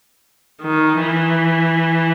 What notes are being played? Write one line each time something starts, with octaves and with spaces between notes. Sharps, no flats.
D#3
E3